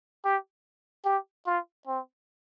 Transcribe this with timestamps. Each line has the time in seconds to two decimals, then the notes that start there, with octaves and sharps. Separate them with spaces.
0.24 G4
1.05 G4
1.46 F4
1.87 C4